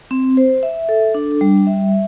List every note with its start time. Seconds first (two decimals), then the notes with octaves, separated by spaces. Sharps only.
0.11 C4
0.37 C5
0.63 E5
0.89 A4
1.14 D4
1.41 G3
1.67 E5